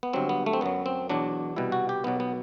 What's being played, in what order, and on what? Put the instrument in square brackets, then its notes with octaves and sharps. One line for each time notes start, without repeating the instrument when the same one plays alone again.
[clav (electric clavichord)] B3
G1 G2 F#3 C4
B3
A3
C4
F#2 F#3 B3
C4
E2 B2 F#3 D4
C2 B2 G3 E4
F#4
G4
B1 B2 F#3 B3
B3